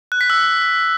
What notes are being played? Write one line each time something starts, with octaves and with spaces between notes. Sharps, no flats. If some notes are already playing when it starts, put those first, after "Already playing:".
F#6
B6
E6